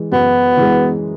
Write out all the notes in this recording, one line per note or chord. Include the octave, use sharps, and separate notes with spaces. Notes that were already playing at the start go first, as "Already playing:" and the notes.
Already playing: E3 G#3
F#2 B3
E3 G#3